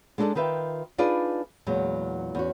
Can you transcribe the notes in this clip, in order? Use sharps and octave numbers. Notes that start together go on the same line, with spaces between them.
G#3 D4 D#4 G#4 A4 D5
D#3 F4 B4 E5 G5
D4 D#4 F4 G#4 B4 D5
E2 A#2 F#3 G#3
E2 C#4 F#4